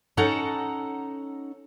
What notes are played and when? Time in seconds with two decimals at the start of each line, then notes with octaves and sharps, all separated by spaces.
0.17 C#4 D#4 A4 F#5 A5 A#5